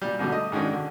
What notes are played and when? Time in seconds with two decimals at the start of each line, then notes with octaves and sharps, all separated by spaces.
0.02 A#2 G3
0.19 G#2 B2 D3 G3
0.32 A3 D#5
0.52 G#2 D#3 G#3 C#4 D4
0.73 D3